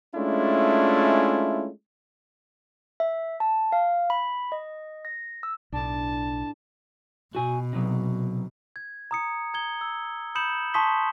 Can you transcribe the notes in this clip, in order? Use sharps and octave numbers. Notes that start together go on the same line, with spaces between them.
G#3 A3 C#4 D4 E4 F4
E5
A5
F5
B5
D#5
A#6
E6
B1 A2 D4 A5
B2 F#4 G#5
C3 F#3
G#6
A#5 D#6 C#7
A#5 G#6 G7
E6
B5 D#6 G6 C#7 E7 F#7
A5 C6 C#6 D#6 B6 G7